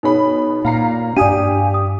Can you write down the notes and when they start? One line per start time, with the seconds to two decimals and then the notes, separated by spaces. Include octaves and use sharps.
0.03 B2 D#4 G#4 C#5 B5
0.65 A#2 F5 A#5 C7
1.17 G2 D4 G4 D5 F5 G#5 D#6 D#7
1.74 D#6